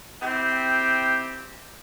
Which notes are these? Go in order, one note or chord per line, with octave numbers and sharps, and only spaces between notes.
C4 E4 G4